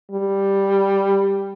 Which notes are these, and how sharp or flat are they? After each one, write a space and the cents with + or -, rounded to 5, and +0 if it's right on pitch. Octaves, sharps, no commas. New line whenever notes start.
G3 +5